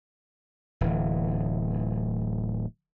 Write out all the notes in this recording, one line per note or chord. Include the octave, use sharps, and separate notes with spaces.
D1 E3